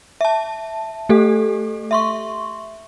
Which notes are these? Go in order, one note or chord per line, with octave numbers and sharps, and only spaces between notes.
E5 A5
A3 G4 A4
E5 C6 C#6